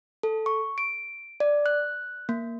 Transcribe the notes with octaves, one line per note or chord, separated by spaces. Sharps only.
A4
C#6
D7
D5
F#6
A#3